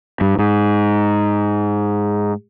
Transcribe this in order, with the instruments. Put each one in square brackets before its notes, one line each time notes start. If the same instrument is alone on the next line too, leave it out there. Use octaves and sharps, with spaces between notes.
[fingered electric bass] G2
G#2